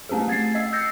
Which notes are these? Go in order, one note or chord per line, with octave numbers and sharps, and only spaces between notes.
A3 C4 C#4 G4 G#4
A3 G#6 A6 C7
D#5 E6
E6 G6 A6 A#6 C7 C#7